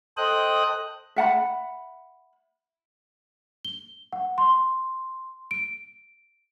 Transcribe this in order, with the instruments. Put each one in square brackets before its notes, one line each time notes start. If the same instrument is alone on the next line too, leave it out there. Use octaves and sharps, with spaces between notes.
[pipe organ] A4 C5 D#5 G5 D#6 F#6
[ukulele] E5 F#5 A5 B5
[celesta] G7
F#5
C6
D7